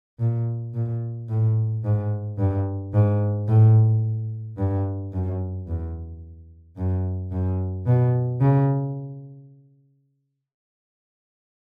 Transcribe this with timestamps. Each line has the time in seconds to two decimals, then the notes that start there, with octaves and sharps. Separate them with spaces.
0.19 A#2
0.74 A#2
1.29 A2
1.84 G#2
2.38 G2
2.93 G#2
3.48 A2
4.58 G2
5.13 F#2
5.67 E2
6.77 F#2
7.31 F#2
7.86 B2
8.41 C#3